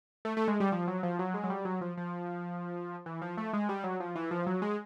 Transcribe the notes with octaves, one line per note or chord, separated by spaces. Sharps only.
A3
A3
G#3
G3
F3
F#3
F3
F#3
G#3
F#3
G3
F#3
F3
F3
E3
F3
A3
G#3
G3
F#3
F3
E3
F3
F#3
G#3